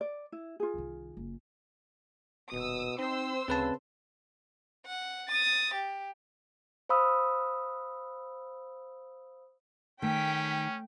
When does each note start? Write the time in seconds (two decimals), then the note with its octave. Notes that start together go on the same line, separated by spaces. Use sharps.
0.01 D5
0.32 E4
0.60 F4 G#4
0.74 C2 D#3
1.17 F#1 F#2
2.52 D#1 B2 D#6 E6
2.98 C4 D#4 C5 C6 E6
3.48 D2 C#3 C4 B4 A5
4.87 F#5
5.28 D#6 A6
5.74 G4
6.89 C5 F5 B5 D#6 E6
10.02 D#3 A3 C#4 G5 B6